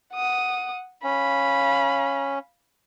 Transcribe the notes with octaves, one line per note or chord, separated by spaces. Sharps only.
F#5 D#6
C#4 F5 B5